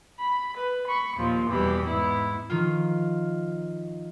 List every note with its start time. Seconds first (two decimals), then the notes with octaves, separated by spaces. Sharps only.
0.18 B5
0.56 B4
0.86 B5 C#6
1.16 D#2 A#2 F3
1.49 E2 B2 E3 G3 G4 B5
1.83 G#2 B3 E4
2.50 D#3 F3 F4